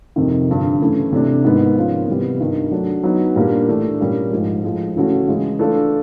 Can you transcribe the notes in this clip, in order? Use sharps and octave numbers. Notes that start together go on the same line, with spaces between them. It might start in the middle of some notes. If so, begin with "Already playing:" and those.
F2 C3 D#3
G2 D3 F3
F#2 C#3 E3 A3
C3 E3 A3 D4
G#2 D#3 G#3 B3
G#2 F3 A#3 C#4 F4
C3 E3 G3 B3
G2 D#3 G3
F#3 A3 D4
F#3 B3 D#4
A#2 G3 A#3 D4 G4
A2 E3 A3 D4
A#2 G3 A#3 C#4
G#2 F3 G#3
A2 F3 G#3
C#3 E3 A3 C#4 F#4
C#3 E3 G#3
E3 A3 D4 F4 A4